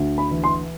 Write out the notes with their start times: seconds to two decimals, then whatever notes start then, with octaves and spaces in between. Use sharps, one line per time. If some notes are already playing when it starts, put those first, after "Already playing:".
Already playing: D2
0.18 B5
0.31 E3
0.44 C6